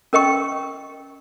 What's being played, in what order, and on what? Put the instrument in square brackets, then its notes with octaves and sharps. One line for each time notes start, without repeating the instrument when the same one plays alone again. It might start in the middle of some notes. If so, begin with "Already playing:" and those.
[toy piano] C#4 A#4 D#5 G5 C#6